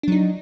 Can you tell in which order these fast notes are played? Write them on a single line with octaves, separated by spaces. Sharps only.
D4 F#3 D#4